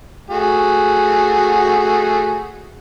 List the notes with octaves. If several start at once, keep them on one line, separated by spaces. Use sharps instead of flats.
A3 F#4 G#4